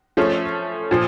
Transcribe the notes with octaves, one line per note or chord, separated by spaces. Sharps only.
F3 A3 C#4
A#2 F3